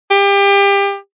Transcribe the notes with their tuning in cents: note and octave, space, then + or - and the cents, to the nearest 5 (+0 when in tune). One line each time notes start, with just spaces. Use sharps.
G4 +30